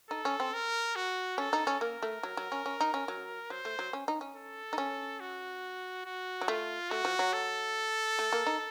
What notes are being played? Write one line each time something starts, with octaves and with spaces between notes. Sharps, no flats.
D#4 A4
C#4
C4
A#4
F#4
C#4 A4
D#4
C#4
A#3 A#4
A3
F#3
F#3
C#4
C#4
D#4
C#4
F#3
F#3 C5
A3
F#3
C#4
D#4
C#4
A4
D#4
C#4
F#4
F#4
F#3
A3 F4
A3 F#4
F3
F#3
A4
A3
A#3
D#4